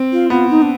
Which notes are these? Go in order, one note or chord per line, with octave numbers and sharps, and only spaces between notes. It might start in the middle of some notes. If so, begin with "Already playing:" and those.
Already playing: C4
F4
B3 F4
D#4
D4